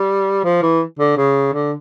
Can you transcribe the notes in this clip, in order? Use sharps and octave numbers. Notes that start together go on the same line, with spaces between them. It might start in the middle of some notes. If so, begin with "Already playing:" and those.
Already playing: G3
F3
E3
D3
C#3
D3